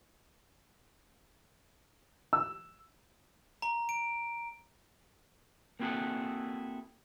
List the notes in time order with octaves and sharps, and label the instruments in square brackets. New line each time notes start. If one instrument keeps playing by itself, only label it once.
[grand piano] E6
[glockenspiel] A#5
D7
[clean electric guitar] A#3 C4 E4 F#4 G#4 A4